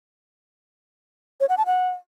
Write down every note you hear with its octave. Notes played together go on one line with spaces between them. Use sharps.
C#5
F#5
A5
F#5